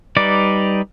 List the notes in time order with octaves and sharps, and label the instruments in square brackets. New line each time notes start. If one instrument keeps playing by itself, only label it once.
[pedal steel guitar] G3 D#4 B4 D5 D6